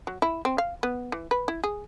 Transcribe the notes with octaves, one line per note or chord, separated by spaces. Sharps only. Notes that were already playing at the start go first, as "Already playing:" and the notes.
F#3
E4
C4
F5
B3
E3
B4
E4
G#4